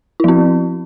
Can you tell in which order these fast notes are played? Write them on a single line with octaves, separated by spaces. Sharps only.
E4 F3 C4